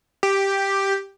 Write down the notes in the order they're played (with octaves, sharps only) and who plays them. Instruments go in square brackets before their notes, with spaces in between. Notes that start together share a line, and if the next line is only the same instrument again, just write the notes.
[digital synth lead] G4